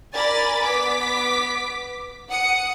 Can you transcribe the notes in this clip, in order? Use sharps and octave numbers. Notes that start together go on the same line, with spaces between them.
A#4 D5 G#5 B5 A6
B3 D6 B6
F#5 D#6 C#7